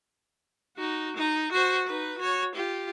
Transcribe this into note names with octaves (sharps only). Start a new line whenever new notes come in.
D#4 F#4
D#4
F#4 C5
D#4 B4
F#4 C#5
F4 G4